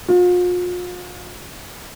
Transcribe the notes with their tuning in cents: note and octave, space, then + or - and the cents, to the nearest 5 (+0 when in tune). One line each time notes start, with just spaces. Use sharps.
F4 +40